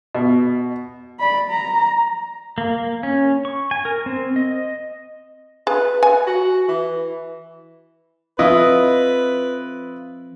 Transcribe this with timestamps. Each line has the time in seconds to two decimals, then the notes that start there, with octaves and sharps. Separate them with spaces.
0.15 B2
1.19 D5 B5
1.50 A#5
2.58 A#3
3.03 C#4
3.45 C#6
3.71 G#5
3.85 A#4
4.06 C4
4.36 D#5
5.67 G#4 B4
6.03 G#5
6.27 F#4
6.68 E3
8.39 F3 C4 E4 F4 B4 D#5